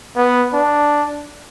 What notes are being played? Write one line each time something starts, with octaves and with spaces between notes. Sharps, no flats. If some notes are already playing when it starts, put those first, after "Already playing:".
B3
D4